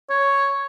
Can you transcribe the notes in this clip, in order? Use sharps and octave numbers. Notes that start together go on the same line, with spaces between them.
C#5